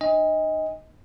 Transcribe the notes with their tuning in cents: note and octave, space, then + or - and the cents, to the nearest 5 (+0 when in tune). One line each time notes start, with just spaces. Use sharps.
D4 +45 D#5 +20 G#5 -40